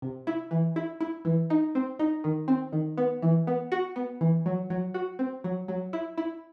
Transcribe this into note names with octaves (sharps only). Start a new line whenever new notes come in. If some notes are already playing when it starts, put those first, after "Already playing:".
C3
E4
E3
E4
E4
E3
D#4
C4
D#4
D#3
C4
D#3
B3
E3
B3
F#4
B3
E3
F#3
F#3
F#4
C4
F#3
F#3
E4
E4